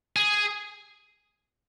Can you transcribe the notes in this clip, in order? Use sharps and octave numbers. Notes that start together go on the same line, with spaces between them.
G#4